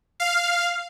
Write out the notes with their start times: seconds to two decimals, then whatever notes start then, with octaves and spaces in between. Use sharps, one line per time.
0.20 F5